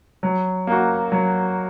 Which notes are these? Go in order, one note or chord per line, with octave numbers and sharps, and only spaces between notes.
F#3
A#3 F#4
F#3